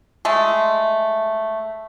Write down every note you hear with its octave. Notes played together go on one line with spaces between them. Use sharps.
G#3 A3